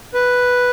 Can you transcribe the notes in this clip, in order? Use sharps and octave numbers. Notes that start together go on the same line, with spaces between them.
B4